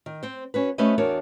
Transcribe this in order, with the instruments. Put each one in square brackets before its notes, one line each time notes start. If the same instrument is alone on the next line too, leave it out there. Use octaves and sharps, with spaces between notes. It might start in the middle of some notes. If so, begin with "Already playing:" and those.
[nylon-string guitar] D#3
C4 C5
C#4 F#4 B4
A3 C#4 F#4 B4 C5 D#5
E2 D4 F#4 A#4 C#5